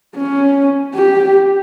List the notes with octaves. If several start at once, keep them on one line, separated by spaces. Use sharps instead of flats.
C#4
G4